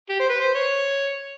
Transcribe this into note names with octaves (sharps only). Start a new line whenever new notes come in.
G4
C5
B4
C5
C#5